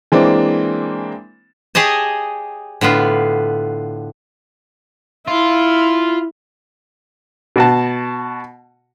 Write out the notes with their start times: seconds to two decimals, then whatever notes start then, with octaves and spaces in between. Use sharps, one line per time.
0.12 E3 G#3 A#3 C4 D4
1.75 G4 G#4 C#5 D#5 A5
2.81 A2 D3 B3 F4
5.27 E4 F4
7.56 B2 F#4 A5